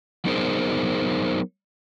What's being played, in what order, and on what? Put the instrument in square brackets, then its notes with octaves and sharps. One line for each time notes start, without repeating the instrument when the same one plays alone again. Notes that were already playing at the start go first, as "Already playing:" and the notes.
[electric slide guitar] F#3 B3 D#4 G#4 A#4 C5